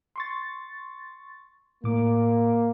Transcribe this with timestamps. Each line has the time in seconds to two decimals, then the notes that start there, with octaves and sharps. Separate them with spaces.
0.16 C6 C#6 A6
1.84 A2 A#3 D6